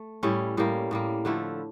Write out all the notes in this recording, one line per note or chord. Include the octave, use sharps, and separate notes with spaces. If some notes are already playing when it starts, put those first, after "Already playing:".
Already playing: A3
A2 G3 C#4 E4
A2 G3 A#3
A2 G3 A#3
D3 F3 A3 E4